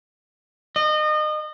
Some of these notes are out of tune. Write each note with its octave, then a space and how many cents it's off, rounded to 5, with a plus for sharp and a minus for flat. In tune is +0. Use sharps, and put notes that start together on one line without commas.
D#5 -30